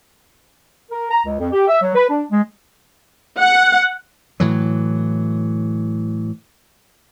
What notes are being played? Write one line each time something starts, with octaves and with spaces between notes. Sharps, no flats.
A#4
A#5
C#2
F2
G4
E5
F#3
B4
D4
G#3
F#5
A2 E3 F#3